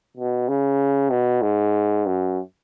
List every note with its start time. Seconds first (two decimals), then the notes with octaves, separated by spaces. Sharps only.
0.17 B2
0.48 C#3
1.11 B2
1.42 G#2
2.06 F#2